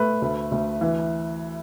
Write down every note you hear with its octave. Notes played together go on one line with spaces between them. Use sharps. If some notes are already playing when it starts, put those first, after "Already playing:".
Already playing: A3 B4
D2
D2
E3